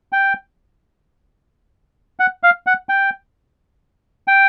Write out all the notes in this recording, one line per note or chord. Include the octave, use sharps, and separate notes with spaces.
G5
F#5
F5
F#5
G5
G5